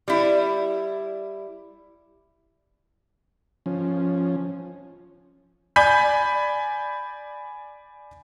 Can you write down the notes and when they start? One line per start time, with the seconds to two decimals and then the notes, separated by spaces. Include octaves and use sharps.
0.08 G3 E4
3.66 F3 C#4
5.76 D5 G#5 B5 G6 B6